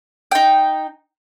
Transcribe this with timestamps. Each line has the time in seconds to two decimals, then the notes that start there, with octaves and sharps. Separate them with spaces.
0.31 D#4 G5